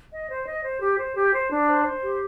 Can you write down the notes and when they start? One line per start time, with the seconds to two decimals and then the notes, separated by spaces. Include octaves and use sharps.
0.12 D#5
0.29 C5
0.46 D#5
0.63 C5
0.80 G4
0.97 C5
1.15 G4
1.33 C5
1.50 D4
1.67 C5
1.84 C5
2.02 G4